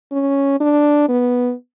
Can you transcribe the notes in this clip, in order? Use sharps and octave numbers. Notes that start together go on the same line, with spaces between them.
C#4
D4
B3